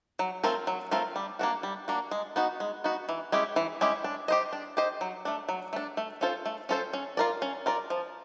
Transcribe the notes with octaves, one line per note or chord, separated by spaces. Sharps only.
F#3
A3 C4 F4 A#4
F#3
A3 C4 F4 A#4
G3
A#3 D4 F#4
G3
A#3 D4 F#4
G#3
B3 D#4 F#4
G#3
B3 D#4 F#4
E3
G#3 C#4 E4 G4
E3
G#3 C#4 E4 G4
D4
G4 C5 D#5
D4
G4 C5 D#5
F#3
A3 D4
F#3
A3 D4
A3
C#4 F4 A4 C5
A3
C#4 F4 A4 C5
C#4
F4 A#4 D5
C#4
F4 A#4 D5
F3